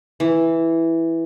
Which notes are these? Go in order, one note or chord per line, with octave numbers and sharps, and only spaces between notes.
E3